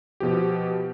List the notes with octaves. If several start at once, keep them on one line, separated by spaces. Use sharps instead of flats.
B2 F3 G4